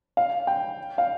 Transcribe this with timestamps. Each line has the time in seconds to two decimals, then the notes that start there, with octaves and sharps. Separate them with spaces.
0.17 F5
0.47 G5
0.98 F5